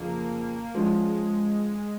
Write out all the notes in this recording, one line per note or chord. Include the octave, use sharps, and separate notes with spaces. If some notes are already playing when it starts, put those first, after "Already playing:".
Already playing: F2 C#3 F3 A#3
F3 G#3 C#4 F4